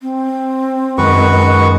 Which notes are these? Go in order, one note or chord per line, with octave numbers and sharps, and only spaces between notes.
C4
F#2 D#3 G#3 F#4 B4 C#6